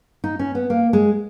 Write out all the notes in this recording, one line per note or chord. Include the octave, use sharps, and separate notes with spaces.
D#4
C#4
B3
A#3
G#3